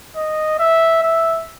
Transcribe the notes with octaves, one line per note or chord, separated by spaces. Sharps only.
D#5
E5
E5